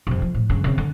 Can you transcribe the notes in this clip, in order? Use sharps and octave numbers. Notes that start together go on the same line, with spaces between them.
F2 C3
F3
A2
G2 C#3
C#3 C4
D3